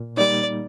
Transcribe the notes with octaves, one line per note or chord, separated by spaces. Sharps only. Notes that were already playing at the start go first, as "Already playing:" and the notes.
Already playing: A#2
G3 A#3 D#4 D5